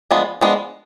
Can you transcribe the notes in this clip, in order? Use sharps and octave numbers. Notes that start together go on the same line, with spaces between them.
F3 G#3 B3 D4
F3 G#3 B3 D4